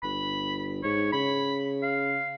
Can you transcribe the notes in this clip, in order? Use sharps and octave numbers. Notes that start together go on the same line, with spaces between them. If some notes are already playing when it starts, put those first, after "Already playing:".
G1 B5
G#2 C#5
C#3 B5
F5